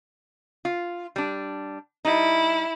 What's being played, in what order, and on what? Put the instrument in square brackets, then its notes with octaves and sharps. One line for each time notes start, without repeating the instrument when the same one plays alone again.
[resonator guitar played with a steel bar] F4
G3 D4
[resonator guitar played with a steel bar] G3 D#4 [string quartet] E4